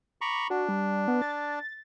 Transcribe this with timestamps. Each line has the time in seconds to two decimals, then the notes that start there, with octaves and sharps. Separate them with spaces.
0.21 A#5 B5 C#6 D6
0.50 D4 F#4
0.69 G3
1.08 B3
1.22 A6